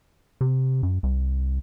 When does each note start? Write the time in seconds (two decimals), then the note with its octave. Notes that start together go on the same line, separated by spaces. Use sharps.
0.41 C3
0.83 F#2
1.03 C2